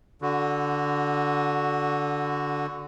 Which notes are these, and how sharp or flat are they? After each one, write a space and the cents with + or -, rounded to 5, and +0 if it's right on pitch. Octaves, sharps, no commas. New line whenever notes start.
D3 -10 F#4 +0